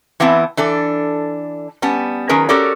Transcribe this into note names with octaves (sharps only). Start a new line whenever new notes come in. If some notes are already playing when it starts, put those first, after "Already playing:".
E3 B3 C4 E4 A5
E3 D4 A4
G3 B3 C#4 A5
D#3 F#3 C#4 G#4 A#4 B4
C#4 F#4 G4 A4 A#4 D5